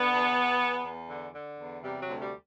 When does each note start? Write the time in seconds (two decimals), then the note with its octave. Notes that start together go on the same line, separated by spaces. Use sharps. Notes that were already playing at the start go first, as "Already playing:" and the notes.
Already playing: D3 B3
0.10 E2
0.35 E2
0.60 E2
0.84 E2
1.10 D3
1.34 D3
1.58 E2
1.83 C3 G3
2.02 F#3
2.08 D2
2.21 G3